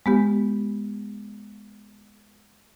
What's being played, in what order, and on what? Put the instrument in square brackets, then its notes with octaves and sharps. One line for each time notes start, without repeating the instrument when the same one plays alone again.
[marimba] G#3 B3 G4